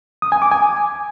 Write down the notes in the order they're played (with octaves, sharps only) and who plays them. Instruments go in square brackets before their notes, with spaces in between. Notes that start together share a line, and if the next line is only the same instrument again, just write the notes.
[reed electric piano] D#6
G#5
D6
G#5